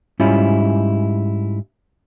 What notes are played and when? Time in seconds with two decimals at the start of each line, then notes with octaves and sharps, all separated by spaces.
0.20 G#2 G3 C#4 E4 F4